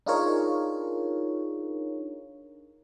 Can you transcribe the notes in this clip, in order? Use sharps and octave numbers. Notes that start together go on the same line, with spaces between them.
D4 D#4 F4 G#4 A#4 C#5